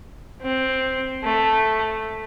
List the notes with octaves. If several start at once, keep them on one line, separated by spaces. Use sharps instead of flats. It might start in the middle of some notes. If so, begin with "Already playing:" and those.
C4
A3